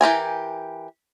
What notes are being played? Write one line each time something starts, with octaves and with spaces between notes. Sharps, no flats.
E3 G4 A#4 G#5